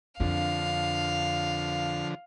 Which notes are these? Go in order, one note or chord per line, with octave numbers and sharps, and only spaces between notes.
F2 D3 F3 D4 F5